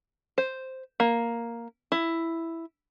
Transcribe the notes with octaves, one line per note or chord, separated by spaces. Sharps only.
C5
A#3
E4